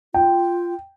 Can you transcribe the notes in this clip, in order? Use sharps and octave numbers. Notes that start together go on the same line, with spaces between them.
F4 G5